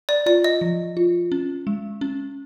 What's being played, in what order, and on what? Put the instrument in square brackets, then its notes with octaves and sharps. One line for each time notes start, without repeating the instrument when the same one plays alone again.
[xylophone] D5
[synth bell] F4 [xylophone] D5
[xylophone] D#5
[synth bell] F3
F4
C#4
G#3
C#4